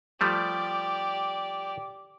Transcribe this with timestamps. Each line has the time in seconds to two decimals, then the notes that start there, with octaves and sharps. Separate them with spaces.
0.21 F3 G3 A3 G4 D5